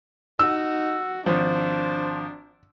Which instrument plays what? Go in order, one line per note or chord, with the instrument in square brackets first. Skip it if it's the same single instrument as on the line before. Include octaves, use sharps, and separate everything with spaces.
[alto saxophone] D#4 [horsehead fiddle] F#4 [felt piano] E6
[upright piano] G#1 F3 [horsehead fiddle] D4 [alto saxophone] C5